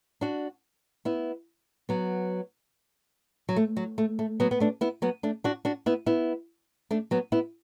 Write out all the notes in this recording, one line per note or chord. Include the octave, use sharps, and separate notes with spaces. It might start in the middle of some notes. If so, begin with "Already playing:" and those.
D4 F#4
B3 E4
F#3 B3
F#3
A3
F#3
A3
A3
F#3 B3
B3
A3 D4
B3 E4
F#3 B3
A3 D4
D4 F#4
D4 F#4
B3 E4
B3 E4
A3 D4
F#3 B3
B3 E4